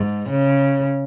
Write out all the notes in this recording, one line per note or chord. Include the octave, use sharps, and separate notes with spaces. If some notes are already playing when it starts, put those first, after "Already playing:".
Already playing: G#2
C#3